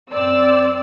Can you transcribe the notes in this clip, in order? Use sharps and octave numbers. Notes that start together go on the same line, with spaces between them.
F#2 C4 D5 E6